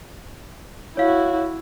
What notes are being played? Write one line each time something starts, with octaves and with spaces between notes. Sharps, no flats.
E4 F#4 C#5 F5